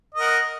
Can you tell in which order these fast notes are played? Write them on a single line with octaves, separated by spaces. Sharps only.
D#5 A#4 F#5